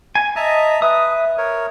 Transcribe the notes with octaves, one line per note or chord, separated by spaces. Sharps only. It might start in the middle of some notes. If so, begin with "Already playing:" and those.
G#5
D#5 E5 A5 A#5
B4 E5 D#6
A#4 C#5